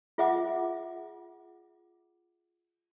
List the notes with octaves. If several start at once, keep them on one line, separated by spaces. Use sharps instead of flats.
F4 G#4 E5 F#5 D6